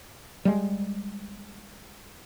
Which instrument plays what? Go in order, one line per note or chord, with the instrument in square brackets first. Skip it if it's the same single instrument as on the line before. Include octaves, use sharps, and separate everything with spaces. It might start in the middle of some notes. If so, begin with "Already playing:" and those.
[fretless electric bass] G3 G#3